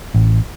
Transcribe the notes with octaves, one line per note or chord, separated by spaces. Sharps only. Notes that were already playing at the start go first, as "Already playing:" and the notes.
A1